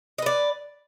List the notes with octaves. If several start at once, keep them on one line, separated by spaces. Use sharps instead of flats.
B4 D5 D#5